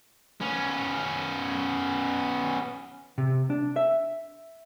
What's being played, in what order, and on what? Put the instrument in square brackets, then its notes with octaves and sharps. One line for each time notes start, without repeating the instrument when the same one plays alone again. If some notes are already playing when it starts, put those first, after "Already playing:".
[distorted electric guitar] B3 C#4
[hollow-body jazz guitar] C3
D4
E5